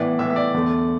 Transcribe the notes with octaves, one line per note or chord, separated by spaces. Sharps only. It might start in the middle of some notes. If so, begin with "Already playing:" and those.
Already playing: A2 E3 B3 D5
A2 E3 B3 E5
E5
D5
E2 D3 A3